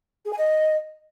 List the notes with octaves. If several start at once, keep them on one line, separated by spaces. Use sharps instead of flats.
G#4
G#5
D#5